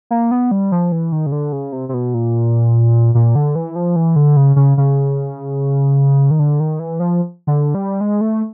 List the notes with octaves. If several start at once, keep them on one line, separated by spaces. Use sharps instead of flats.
A#3
B3
G3
F3
E3
D#3
C#3
D3
C#3
C3
C3
B2
A#2
A#2
D3
E3
F3
E3
D3
C#3
C#3
C#3
D#3
D3
D#3
E3
F3
D3
G3
G#3
A3